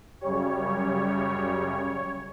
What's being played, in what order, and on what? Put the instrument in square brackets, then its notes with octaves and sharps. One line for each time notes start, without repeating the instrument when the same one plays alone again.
[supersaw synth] F#2 C#3 G3 C#5